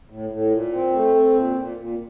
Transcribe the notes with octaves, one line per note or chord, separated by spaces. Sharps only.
A2
A2
A#2
C4
A3
C4
A#2
A#2
A#2